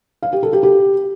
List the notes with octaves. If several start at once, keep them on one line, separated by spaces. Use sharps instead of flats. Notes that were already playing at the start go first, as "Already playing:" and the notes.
F5
G4
A4
G4
G4